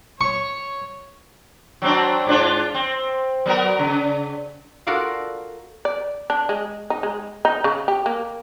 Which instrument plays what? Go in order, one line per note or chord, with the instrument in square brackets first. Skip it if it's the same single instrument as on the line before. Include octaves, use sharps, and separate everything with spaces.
[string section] C#5 [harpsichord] C#6
[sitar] F#3 C4 D4
G#2 D4 F4
C4
F#3 B3 A#4
C#3
[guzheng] F4 F#4 A4 A#4 D5 F5
[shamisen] D5
D4
G#3
D#4
G#3
D#4
C#3
G4
A#3